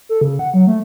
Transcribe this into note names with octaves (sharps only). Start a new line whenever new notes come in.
A4
C#3
F#5
F#3
A3